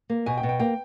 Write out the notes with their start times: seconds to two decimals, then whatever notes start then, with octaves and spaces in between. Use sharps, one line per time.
0.10 A#3
0.26 B2 G#5
0.37 G5
0.43 B2
0.49 G5
0.59 A#3 G5